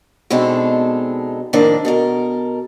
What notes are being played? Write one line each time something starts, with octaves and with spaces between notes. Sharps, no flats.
B2 G#3 C4 D4 D#4 A4
F2 A2 D#3 A#3 D4 D5
B2 A4 A#4